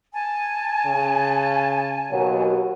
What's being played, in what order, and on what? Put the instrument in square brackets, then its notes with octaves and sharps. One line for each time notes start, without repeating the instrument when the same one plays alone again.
[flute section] G#5 A5
[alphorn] C#3
[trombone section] D#2 F#3 [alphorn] B2